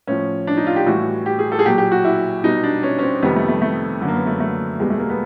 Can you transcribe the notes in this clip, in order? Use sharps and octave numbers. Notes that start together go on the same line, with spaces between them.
A2 F3 C#4
D4
D#4
F4
G4
A2 E3 G3 F#4
G4
G#4
A4
G#4
A#2 F#3 G4
G4
F#4
E4
B2 G3 D#4
D4
C#4
C#4
C4
F2 C3 D#3 G3 B3
A3
A3
A3
F#2 D3 F#3
A#3
B3
A3
A3
E2 B2 G3 G#3
A3
A#3
B3